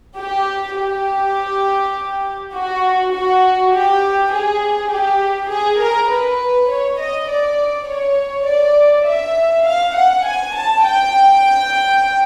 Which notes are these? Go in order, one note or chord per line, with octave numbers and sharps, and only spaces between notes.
G4
G4
F#4
F#4
G4
G#4
G4
G#4
A#4
B4
C#5
D#5
D5
C#5
D5
E5
F5
F#5
G#5
A5
G5